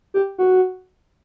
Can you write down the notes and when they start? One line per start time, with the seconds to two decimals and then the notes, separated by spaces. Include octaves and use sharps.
0.14 G4
0.38 F#4